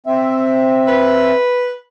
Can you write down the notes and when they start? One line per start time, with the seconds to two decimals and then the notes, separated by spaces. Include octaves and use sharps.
0.06 C4 E5
0.87 B4